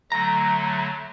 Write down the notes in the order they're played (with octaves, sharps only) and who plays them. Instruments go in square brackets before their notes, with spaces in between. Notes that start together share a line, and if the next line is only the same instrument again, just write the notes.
[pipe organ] D3 F#3 A3 [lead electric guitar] A#5